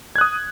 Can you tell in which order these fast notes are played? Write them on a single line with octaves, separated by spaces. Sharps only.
G#6 F#6 D#6